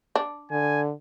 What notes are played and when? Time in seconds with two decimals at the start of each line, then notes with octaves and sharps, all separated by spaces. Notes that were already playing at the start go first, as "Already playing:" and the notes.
0.15 D4
0.51 D3 G#5